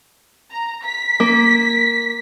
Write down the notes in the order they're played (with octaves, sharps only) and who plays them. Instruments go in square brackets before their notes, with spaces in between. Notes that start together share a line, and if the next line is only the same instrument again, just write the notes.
[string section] A#5
B6
[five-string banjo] A#3